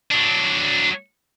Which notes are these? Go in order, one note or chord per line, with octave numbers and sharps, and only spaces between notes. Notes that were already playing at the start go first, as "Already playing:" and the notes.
F#3 D4